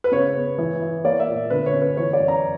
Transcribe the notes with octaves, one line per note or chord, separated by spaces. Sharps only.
B4
C#3 C#5
B3
E3
E4
A#3 D5
E5
A#2
D3 B4
C#5
C#4
B4
E3 C#5
D5
F#2
A#5